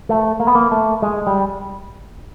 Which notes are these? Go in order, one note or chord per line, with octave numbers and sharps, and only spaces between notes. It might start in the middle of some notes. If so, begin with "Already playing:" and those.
A3
A#3
B3
A#3
A3
G#3
G3